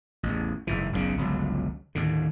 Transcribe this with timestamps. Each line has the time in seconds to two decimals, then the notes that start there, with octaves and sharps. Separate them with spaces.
0.23 A1 E2
0.67 F#1 G#2 E3
0.92 F#1 B1 A2 C#3
1.17 G1 C#2 C3 F#3
1.95 D#2 A2 D3